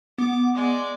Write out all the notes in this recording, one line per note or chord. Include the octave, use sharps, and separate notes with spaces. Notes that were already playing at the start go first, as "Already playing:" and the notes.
B3 D6
G#3 D5